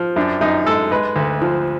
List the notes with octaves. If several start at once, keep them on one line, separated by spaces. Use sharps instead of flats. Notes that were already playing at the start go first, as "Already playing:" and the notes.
Already playing: F3
F#2 D4
F#2 D#4
G#3 A4
G#3 B4
D2
F3